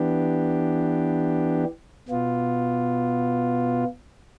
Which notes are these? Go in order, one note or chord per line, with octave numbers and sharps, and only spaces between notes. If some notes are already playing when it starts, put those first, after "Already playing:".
Already playing: E3 B3 D4 G4
B2 B3 F4